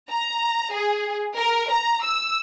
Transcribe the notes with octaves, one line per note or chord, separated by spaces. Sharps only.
A#5
G#4
A#4
A#5
E6